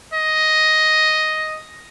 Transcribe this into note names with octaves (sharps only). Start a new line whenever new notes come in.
D#5